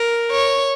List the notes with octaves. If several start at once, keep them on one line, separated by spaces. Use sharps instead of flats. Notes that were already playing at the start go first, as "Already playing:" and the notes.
Already playing: A#4
C#5